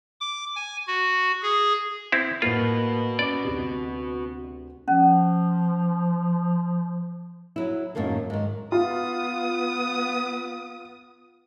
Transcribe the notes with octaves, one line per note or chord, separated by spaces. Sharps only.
D6
G#5
F#4
G#4
C4 E4
A2 A#3 F4 F#4 B4
C#4 D5 D6
D2 C3
F3 C#4
F#3 E4
F#2 A2 D#3 A3 A#3
G#2 D#3
B3 F4 D#6